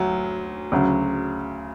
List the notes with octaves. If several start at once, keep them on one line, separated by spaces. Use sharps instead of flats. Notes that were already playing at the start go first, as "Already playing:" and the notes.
Already playing: D2 F#3
D2 C#3 F#3